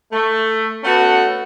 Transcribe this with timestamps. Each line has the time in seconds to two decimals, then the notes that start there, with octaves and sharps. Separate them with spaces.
0.12 A3
0.84 A3 B3 C#4 F#4 A4 F#5